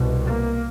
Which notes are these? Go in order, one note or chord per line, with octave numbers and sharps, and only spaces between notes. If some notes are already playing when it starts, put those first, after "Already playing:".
Already playing: C2 B2
A#3